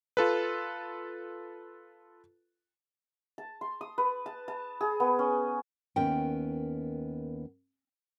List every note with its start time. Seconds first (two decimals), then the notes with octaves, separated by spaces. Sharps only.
0.17 F4 A4 B4
3.38 A5
3.61 C6
3.81 D#6
3.98 B4
4.26 A5
4.48 A5
4.81 G#4
5.00 B3
5.19 C#4
5.96 D#2 B3 C#4 A#4 G5